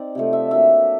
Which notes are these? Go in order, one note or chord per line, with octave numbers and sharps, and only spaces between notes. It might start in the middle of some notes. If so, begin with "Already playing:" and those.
Already playing: C4 D#4 D5
C3 F3 A3
E5
F#3 A#3 D4 E5